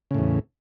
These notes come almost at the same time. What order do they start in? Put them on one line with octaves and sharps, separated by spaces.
C#3 A2 E2